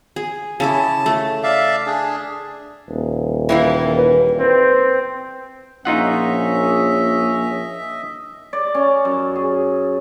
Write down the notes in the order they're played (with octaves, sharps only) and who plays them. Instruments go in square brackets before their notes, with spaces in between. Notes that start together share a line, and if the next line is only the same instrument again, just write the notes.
[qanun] G#4
[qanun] C#3 E4 D6 [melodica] A5
[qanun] A3
[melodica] D5 E5 F5
D4 G#4
[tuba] D#1
[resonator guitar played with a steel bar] E3 G3 A#3 [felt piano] E4 G5
[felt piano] B4
[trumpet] C4 [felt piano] B4
[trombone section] A#1 [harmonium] C#4 [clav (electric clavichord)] D#4 F4 F#5 [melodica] D#5 E5
[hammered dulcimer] D5
C#4
F#2
G#4